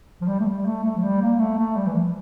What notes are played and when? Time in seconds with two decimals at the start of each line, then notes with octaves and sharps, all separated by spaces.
0.21 F3
0.28 G3
0.40 A3
0.46 G3
0.66 A3
0.83 A3
0.96 F3
1.03 G3
1.21 A#3
1.39 A3
1.58 A3
1.77 G3
1.87 E3
1.95 F3